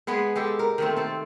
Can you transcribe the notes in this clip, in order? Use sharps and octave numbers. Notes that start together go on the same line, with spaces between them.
G#3 B3 G#4 B4
G#3 G4 A4
A#4
D#3 A3 C4
C4 A4